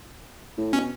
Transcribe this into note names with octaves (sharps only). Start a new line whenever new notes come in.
A2
B2 C#4